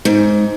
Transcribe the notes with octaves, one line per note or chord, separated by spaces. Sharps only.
G#2